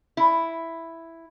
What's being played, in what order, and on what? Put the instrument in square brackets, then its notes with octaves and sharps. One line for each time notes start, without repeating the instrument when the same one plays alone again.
[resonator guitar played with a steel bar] E4